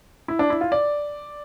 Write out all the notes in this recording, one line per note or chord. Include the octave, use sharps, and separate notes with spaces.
E4
D4
E4
F4
D5